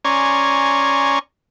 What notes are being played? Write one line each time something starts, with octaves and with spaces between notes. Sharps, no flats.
C#4 D5 G#5 A#5 C6 C#6